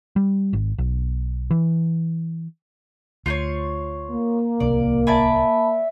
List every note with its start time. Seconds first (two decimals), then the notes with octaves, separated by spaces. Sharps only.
0.16 G3
0.53 G#1
0.78 B1
1.51 E3
3.26 D2 F4 C5 C#5
4.11 A#3
4.60 D1 C2 C3 D5
5.07 D5 E5 G#5 A5 B5